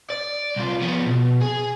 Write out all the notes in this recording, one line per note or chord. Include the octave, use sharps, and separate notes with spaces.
D5
C2 F4
F3 B3
B2
G#4